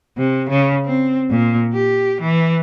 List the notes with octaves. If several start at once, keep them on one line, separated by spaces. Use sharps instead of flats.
C3
C#3
C4
A#2
G4
E3